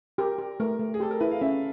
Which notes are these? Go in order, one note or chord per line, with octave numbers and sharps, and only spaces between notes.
G4 A#4
G4
A3 A#4
A3
G#4
G4 A4
A#4
E4 B4
F5
C#4 E5